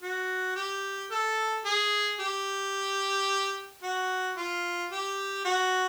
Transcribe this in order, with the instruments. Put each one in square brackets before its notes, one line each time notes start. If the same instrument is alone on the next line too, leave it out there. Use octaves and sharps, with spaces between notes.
[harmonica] F#4
G4
A4
G#4
G4
F#4
F4
G4
F#4